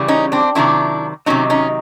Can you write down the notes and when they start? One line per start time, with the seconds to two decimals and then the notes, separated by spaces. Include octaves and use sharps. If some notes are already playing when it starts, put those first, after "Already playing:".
Already playing: C#3 E3 G3
0.08 C#4 D#4
0.32 C4 D4
0.55 C3 D#3 F#3 D4 E4
1.26 C3 D#3 F#3 C#4 D#4
1.50 C#4 D#4